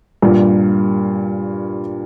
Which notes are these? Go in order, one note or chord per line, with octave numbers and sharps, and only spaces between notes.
G2 A#2